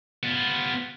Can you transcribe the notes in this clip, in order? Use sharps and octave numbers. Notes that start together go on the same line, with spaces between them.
B3 F4